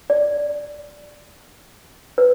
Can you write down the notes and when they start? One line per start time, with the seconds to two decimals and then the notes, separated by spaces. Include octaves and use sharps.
0.10 D5
2.18 B4